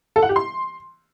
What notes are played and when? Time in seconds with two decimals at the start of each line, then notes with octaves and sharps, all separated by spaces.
0.16 A4
0.23 F#5
0.29 G4
0.36 C6